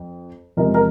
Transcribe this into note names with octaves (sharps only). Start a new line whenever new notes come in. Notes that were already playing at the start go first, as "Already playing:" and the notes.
Already playing: F2
E2 C3 F3 G#3 A#4
A#4